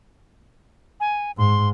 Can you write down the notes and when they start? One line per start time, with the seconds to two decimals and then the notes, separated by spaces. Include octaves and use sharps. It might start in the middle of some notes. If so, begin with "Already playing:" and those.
1.00 G#5
1.38 G#2 C6